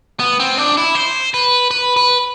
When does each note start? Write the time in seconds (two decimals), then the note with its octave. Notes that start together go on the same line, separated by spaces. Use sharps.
0.20 B3
0.40 C4
0.58 D4
0.77 E4
0.95 C5
1.34 B4
1.71 B4
1.96 B4